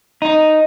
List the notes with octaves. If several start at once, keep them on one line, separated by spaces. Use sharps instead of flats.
D#4